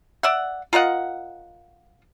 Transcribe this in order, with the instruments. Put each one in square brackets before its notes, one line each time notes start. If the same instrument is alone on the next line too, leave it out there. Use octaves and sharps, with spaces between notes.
[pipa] D5 E5 F#5
F4 A#4 D#5 F#5